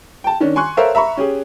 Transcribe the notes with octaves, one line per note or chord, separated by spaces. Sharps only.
G5 A5
D#3 C#4 D4
G#5 C6 C#6 F#6
A4 A#4 C5 C#5 E5 F5
E5 A#5 B5 C#6
C#4 G4 G#4